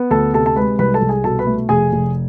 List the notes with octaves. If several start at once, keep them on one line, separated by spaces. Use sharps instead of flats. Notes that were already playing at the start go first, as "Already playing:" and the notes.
Already playing: B3
D2 A4 A5
C3 A4 A5
A5
G#3 B4 B5
C2 B4 B5
A4 A5
C2
G#4 G#5
B2 A4 A5
B4 B5
A3
F1 G#4 G#5
F1